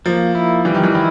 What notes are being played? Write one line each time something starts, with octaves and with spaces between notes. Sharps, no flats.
F3 A#3
E4
E3 G3
D#3
E3
D#3 E4